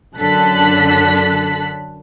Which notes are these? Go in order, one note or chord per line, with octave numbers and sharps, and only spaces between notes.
F#2 D3 A4 F#6 B6